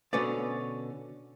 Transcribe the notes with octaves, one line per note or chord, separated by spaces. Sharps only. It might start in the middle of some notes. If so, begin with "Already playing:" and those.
B2 D3 C#4 B4 D5